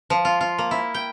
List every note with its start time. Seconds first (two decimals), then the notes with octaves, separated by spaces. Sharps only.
0.10 F3
0.25 F4
0.41 F4
0.58 A#3
0.71 E4
0.94 G5